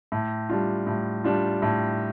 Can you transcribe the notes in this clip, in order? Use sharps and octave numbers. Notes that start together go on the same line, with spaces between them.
A2
G3 D4 F4
A2
G3 D4 F4
A2